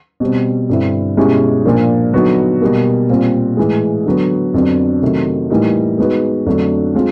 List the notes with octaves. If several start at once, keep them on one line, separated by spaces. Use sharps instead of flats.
B2 G3 C4
G2 D3 G3 C4 E4
B2 G#3 C#4 E4 G4
A#2 F3 A#3 D4
D3 F#3 B3 D#4 F#4
B2 G3 A#3
A#2 G3 C4 F4
A2 E3 G#3
D3 F#3 B3
F2 D3 F#3 B3 D4
C3 D#3 F#3 A3
A2 E3 G3 A#3 D#4
G#3 B3 D#4 F#4 B4
F2 D3 F#3 A3 D4
G#3 C4 F4